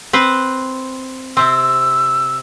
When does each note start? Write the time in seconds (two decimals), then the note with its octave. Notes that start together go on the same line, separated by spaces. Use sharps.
0.13 C4 B4 C5
1.37 C3 C4 E6